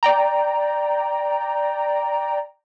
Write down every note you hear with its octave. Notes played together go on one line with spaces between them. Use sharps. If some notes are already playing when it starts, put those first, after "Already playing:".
D5 G5 A#5